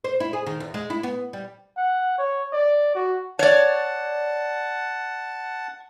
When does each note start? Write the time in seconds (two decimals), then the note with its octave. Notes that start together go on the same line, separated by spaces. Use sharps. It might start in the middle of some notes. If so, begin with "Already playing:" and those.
0.04 C5
0.20 E4
0.33 G#4
0.46 D#3
0.60 E2
0.74 G#3
0.90 E4
1.03 B3
1.33 G3
1.77 F#5
2.18 C#5
2.53 D5
2.95 F#4
3.39 C#5 D5 F#5 A5